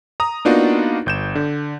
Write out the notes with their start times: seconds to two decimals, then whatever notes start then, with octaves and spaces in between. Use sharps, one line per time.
0.20 A#5 D#6
0.45 A#3 B3 D4 D#4 F4 F#4
1.06 G1 G6 E7
1.35 D3